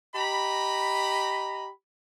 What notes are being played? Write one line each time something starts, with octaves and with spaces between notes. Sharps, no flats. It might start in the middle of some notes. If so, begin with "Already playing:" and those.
G4 D#5 A#5 B5